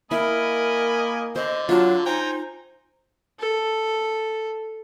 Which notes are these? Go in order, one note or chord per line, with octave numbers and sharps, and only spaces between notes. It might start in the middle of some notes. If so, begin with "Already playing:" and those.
A#3 E4 A#4 D#5 G#5 B5
D3 C5 D#5
F#3 D4 F4
D#4 C5 G5 G#5 A#5
A4